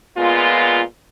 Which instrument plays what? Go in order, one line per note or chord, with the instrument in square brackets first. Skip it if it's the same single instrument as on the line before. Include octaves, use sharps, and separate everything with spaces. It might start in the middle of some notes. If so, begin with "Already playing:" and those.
[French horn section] A#2 G#3 B3 F4